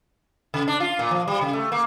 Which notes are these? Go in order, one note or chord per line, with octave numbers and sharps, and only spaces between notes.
C#3
D4
F4
A#2
F3
G3
C#3
A3
A#3